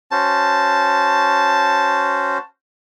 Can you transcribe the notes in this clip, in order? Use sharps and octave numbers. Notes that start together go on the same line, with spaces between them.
C#4 F#4 C5 A5